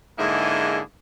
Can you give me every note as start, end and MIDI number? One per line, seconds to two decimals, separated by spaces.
0.18 0.81 44
0.18 0.81 50
0.18 0.81 58
0.18 0.81 64
0.18 0.81 68
0.18 0.81 75